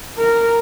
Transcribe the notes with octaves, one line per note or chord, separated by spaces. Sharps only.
A#4